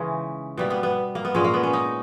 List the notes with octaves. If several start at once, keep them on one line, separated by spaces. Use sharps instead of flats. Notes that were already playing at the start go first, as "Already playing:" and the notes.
Already playing: C#3 E3 G#3 C#4 D#4
B2 G3 A#3
B3
B3
A#3
B3
A#2 G#3 C#4
A#3
B3
C#4
D#4